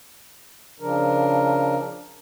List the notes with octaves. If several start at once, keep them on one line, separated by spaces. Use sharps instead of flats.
C#3 F3 D4 A#4